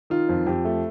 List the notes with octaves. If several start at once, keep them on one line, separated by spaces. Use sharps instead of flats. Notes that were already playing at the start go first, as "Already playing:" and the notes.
D#3 F4
F2
F2 G4
A3